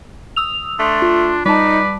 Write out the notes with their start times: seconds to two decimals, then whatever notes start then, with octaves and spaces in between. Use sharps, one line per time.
0.36 D#6 E6 F7
0.79 A3 D4 C6
1.02 F4
1.46 G3 D#4 B4 D5 A5